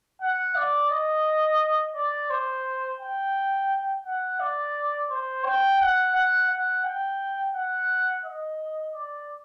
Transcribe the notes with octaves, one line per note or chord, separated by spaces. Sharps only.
F#5
D5
D#5
D5
C5
G5
F#5
D5
C5
G5
F#5
F#5
F#5
G5
F#5
D#5
D5